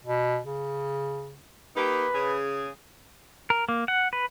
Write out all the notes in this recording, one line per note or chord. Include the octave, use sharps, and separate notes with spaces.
B2
C#3
A#3 D#4 G4 B4
C#3 G#4
A#4
A#3
F#5
B4